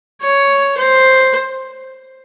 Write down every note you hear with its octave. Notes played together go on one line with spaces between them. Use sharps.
C#5
C5